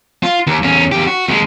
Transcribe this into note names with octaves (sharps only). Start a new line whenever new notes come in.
F4
D#2
E2 C#4
E2 G4
F#4
D#2 G#3